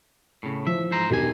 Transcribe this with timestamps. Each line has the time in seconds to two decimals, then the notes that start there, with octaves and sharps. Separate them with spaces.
0.43 A2 C#3
0.67 E3 F3 E5
0.92 G#2 C5 A#5
1.10 E1 G2 D#3 G4 G#5